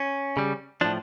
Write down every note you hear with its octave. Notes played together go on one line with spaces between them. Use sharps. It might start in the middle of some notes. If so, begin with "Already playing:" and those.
Already playing: C#4
C#3 G3
A2 F3 D4